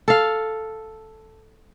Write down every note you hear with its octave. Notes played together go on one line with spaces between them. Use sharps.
A4 F5